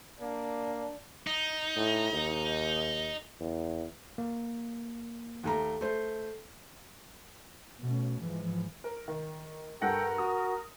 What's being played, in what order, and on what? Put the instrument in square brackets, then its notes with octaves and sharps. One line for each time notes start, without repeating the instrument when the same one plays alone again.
[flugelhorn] A#3 [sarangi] D4
[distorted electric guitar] D#4
[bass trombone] A2
D#2
E2
[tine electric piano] A#3
[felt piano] D#2 A3 A#5
A3 C5
[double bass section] B2 A3 C#4
G#2 E3 F3 G#3
[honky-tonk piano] A#4
D#3
[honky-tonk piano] G2 F#5 A#6 [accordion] A4 G5 [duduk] A#4
[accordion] F#4 [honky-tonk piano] D#6